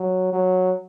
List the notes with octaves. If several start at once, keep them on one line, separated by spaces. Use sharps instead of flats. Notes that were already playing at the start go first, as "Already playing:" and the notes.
Already playing: F#3
F#3